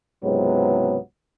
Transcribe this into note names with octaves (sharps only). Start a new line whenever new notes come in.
C#2 G#2 C3 F#3 B3